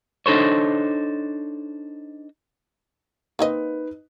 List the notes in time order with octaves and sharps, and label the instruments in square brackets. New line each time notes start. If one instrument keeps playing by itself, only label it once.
[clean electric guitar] D4 D#4 A4 C5 C#5
[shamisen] A#3 C4 D#5 [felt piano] D#4 B4